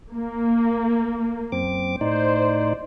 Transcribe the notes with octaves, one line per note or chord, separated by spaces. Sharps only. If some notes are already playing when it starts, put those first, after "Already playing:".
A#3
F#2 C4 D6
A2 D#4 C5 D5